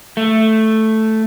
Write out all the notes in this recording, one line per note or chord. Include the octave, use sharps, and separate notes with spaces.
A3